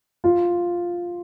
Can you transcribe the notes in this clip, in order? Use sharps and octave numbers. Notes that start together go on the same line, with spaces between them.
F4